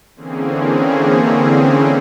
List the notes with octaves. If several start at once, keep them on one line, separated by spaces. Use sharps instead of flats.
D3 E3 A#3 C4 C#4 G#4